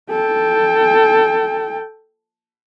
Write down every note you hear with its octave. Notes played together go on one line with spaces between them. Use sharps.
A4 G5